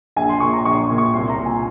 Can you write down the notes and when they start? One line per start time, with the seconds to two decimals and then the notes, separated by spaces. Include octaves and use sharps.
0.16 A#1 G#5
0.29 C6
0.40 A#2 C#6
0.53 A#5
0.65 A#1 C#6
0.82 C#6
0.90 A#2
0.98 C#6
1.13 C2 C6
1.30 A#5
1.39 A#2
1.46 G#5